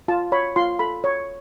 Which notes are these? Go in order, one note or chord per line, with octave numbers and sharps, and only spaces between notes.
F4 A5
C#5 B5
F4 C6
A4 B5
C#5